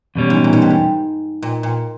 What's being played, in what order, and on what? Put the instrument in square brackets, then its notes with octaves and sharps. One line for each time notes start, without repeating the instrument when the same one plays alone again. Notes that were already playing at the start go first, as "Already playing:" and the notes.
[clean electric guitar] E2 B2 G3 C#4
[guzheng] G#2
A#2
G#2
G2
G#2
A#2
A#2